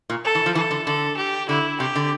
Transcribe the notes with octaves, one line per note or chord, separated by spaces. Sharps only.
A#2
A4
E3
F3
E3 A4
D3
D3 A4
G4
D3 E4
C3 G4
D3